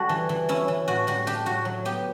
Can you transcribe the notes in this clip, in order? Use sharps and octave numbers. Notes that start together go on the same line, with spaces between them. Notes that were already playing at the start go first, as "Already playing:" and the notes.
Already playing: G3 F#4 A4
E3
E3
C#4 E4
E3
A2 F#4
G3 F#4
D4 G4
A2 F#4
F#3
B3 G4